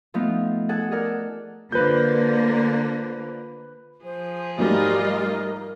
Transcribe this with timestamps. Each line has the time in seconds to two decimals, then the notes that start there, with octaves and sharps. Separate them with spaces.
0.14 F3 A3 B3 D#4
0.69 G#4 A4 F#5 A5
0.91 G#4 A#4 D5 F#5
1.05 A4
1.72 D3 A#3 F4 B4 C5 G6
4.04 F3 G#4 C5
4.58 G#2 F#3 G3 A3 F4 A#4 D#5